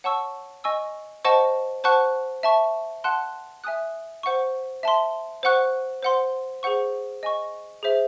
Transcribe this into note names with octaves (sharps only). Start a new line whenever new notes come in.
C#5 F#5 A5 C#6 E6
D#5 G#5 C#6 E6
C5 D#5 F#5 A5 C#6
C5 F#5 A5 C#6 F#6
E5 A5 C#6
F#5 A5 C6 F#6
E5 G#5 D#6 F#6
C5 F#5 C#6
E5 A5 C6
C5 F#5 C#6 F#6
C5 F#5 C6
G#4 C5 F#5 C#6
D#5 G#5 C#6
G#4 C5 E5